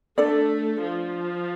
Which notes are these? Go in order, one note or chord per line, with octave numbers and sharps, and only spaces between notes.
A3 D4 A4 D5
F3